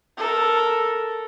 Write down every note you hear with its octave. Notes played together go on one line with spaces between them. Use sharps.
A4 A#4